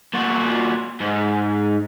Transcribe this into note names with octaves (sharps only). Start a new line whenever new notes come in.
A#2 F#4
G#2